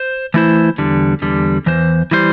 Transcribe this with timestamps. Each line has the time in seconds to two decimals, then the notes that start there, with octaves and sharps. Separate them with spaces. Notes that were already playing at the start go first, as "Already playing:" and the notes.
Already playing: C5
0.34 E3 A3 E4 C5
0.78 E2 D3 G3
1.22 E2 D3 G3
1.66 E2 E3 C5
2.11 E3 G3 E4 C5